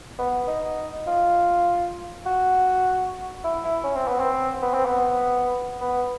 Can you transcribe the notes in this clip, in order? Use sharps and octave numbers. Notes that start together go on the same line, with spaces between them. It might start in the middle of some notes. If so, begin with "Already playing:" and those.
B3
D#4
F4
F#4
E4
E4
C#4
C4
B3
C4
B3
C4
B3
B3